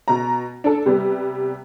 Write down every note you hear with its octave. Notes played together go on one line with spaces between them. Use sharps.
B2 A#5
D4 A4
C3 G3 B3